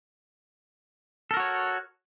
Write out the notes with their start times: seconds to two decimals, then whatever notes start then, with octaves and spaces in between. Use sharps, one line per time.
1.31 A4
1.34 A#4
1.37 F#4
1.40 C#5